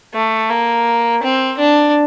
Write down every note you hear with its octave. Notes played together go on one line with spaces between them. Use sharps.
A3
A#3
C4
D4